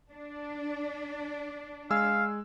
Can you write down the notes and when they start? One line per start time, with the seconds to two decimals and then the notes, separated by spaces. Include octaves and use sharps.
0.12 D4
1.90 G#3 F5 G#5 E6